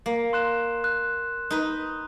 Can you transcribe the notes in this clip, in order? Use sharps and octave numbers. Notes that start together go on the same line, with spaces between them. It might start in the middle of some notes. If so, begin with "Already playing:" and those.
A#3
C6 F#6 E7
F#6
D#4 B4